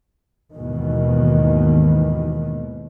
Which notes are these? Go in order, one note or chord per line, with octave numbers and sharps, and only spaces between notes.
D#2 G#2 B2 D#3 E3